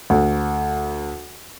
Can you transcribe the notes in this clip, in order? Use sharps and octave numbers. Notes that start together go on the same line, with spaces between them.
D2